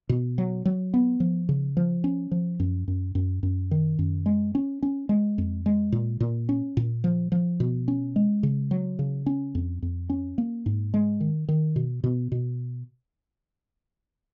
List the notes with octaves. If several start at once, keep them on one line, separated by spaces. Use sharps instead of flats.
B2
F#3
F#3
B3
F3
C#3
F3
C#4
F3
F#2
F#2
F#2
F#2
D#3
F#2
G#3
C#4
C#4
G#3
F2
G#3
A#2
A#2
C#4
A#2
F3
F3
B2
C#4
G#3
C#3
F#3
C#3
C#4
F2
F2
C#4
A#3
G#2
G#3
D#3
D#3
B2
B2
B2